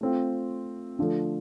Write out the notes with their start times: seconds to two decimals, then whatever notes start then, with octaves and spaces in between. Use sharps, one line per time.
0.01 A3 C4 F4
0.99 D3 F3 A3